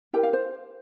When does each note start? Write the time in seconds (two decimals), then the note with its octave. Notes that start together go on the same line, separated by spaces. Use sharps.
0.13 E4 G4 A#4 G5
0.23 F5
0.33 C5